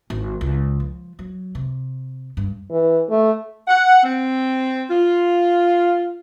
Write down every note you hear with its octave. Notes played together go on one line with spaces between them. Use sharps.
G#1
C#2
F3
F#3
C3
G2
E3
A3
F#5
C4
F4